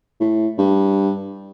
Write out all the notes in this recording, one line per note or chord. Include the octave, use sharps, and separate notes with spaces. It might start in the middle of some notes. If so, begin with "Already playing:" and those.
A2
G2